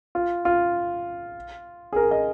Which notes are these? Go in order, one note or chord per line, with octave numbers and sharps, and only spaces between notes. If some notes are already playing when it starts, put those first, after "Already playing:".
F4
F4
G#4
A#4
D#5